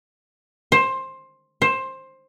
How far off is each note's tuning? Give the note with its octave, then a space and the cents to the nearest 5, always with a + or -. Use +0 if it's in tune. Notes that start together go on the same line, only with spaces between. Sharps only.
C5 +15
C5 +15